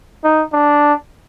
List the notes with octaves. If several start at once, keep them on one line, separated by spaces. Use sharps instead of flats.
D#4
D4